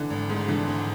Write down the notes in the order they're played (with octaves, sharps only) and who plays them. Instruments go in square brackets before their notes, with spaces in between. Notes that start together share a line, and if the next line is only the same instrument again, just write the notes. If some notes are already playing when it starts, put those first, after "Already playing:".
Already playing: [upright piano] D3 [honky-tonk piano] E3
[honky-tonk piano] G#1
G#2
[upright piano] D3 [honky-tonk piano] E3
[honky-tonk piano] G#1